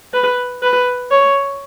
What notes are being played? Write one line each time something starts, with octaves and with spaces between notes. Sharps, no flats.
B4
B4
C#5